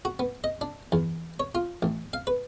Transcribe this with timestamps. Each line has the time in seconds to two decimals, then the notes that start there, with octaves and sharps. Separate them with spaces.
0.05 F#4
0.19 B3
0.44 D#5
0.61 D4
0.92 E2
1.40 C#5
1.55 F4
1.82 A1
2.13 F5
2.27 B4